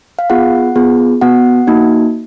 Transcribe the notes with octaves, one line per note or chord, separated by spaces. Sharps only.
F5
B3 F4 G#4 F#5
B3 F4 G#4
B3 F#4 F#5
A#3 D#4 F#4